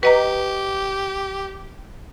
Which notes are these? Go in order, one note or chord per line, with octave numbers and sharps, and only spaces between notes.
G4 B4 D#5 A#5